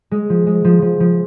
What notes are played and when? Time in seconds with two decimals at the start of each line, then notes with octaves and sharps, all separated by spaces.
0.11 G#3
0.30 F3
0.47 G#3
0.65 F3
0.82 F3
1.00 F3